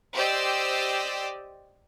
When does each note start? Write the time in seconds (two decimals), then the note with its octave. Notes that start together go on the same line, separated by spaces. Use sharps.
0.14 G4 C5 D5 D#5 E6